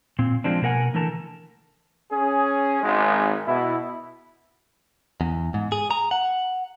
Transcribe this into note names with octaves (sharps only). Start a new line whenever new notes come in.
A#2 C4
F3 G#3 C4 D4
B2 A#3 A#4 F#5 G#5
D3 E3 A3 A#4 A5
C#4 G#4
G#1 G#3
B2 E4
E2
G#2
G#4
A#5
F#5